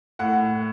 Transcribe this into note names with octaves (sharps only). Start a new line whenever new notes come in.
A2 F#5